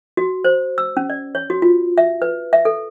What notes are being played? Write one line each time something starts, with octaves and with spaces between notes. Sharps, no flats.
F#4
C5
E6
C#4
D5
C#5
F#4
F4
E5
B4
E5
A4